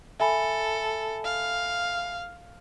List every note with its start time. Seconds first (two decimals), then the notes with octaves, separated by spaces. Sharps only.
0.20 A4 E5 G#5 B5
1.24 F5